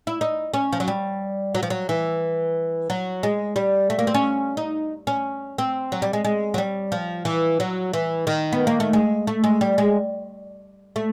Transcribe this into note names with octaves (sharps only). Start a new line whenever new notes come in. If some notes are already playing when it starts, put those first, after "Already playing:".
E4
D#4
C#4
F3
F#3
G3
F#3
F3
F#3
E3
F#3
G#3
G3
A3
A#3
C4
C#4
D#4
C#4
C4
F#3
G3
G#3
G#3
F#3
G3
F3
E3
F#3
E3
D#3
B3
A#3
A3
G#3
A3
G#3
G3
G#3
A3